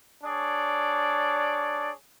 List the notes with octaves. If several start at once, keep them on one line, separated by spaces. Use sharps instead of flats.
D4 G#4 C#5 D5